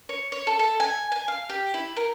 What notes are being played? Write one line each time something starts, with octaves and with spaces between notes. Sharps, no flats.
C#5
C#5
A4
A4
G#5
G#5
F5
G4
E4
A#4